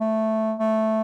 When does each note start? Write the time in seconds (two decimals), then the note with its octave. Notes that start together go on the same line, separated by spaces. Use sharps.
0.01 A3
0.60 A3